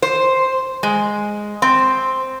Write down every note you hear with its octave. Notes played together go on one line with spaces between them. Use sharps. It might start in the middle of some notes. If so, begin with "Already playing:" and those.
C5
G#3
C4